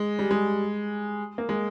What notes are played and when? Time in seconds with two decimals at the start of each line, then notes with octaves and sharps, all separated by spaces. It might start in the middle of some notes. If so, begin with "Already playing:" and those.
Already playing: G#3
0.19 G3
0.31 G#3
1.38 A#3
1.49 G#3